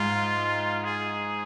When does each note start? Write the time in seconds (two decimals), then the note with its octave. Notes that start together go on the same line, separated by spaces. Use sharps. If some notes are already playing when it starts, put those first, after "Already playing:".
Already playing: G#2 G#3 F4
0.84 G#4